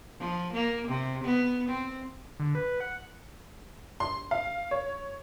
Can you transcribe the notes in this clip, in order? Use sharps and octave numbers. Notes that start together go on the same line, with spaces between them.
F3
A#3
C3
B3
C4
D3
B4
F#5
C6
F5
C#5